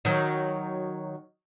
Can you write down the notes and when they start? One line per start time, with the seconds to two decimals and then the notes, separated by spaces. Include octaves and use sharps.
0.05 D#3 F#3